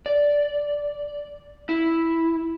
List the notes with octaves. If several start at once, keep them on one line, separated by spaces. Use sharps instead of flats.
D5
E4